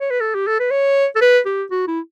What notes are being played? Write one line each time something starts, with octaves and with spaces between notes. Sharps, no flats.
C#5
B4
A4
G4
A4
B4
C#5
A4
B4
G4
F#4
E4